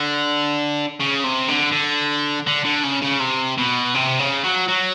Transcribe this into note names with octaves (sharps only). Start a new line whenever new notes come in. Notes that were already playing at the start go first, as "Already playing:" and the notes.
Already playing: D3
C#3
C3
D3
D3
D3
D3
C#3
C#3
C3
B2
C3
C#3
F#3
F#3